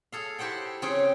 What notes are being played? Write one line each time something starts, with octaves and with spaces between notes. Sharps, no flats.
G#4 A4 F5
E4 G4 C5 F#5 G5
C#3 C4 F4 G#4 C#5 G5